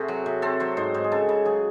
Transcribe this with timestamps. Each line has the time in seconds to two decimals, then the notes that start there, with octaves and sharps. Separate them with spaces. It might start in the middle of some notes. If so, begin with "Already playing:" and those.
Already playing: C3 A3 F#4 G#4 C5
0.08 F#3
0.26 C3
0.42 C4 A4
0.60 F#3 C5
0.77 G#2 C5
0.94 G#2 C5
1.04 G#4
1.12 C#3 A4
1.29 C#3
1.45 F#3 G#4